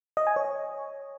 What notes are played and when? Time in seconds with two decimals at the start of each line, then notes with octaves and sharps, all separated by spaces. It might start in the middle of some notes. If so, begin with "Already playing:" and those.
0.17 D#5
0.27 G#5
0.36 C#5